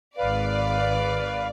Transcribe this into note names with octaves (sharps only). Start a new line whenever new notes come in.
G#1 B4 D5 F5